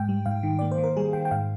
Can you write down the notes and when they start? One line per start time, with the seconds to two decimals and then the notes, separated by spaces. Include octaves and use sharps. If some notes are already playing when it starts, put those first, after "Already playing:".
Already playing: G#2 G5
0.09 G3
0.26 G#2 F5
0.43 D#3
0.59 A#3 D5
0.71 C5
0.78 D#3
0.84 A#4
0.97 G3 G#4
1.13 D#3 G5
1.25 G5
1.31 G#2 F5